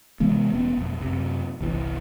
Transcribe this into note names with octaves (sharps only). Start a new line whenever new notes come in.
C3 E3 G#3 B3
E1 B3 C#4
B1 F2
F#2 C3
G1 C2 E3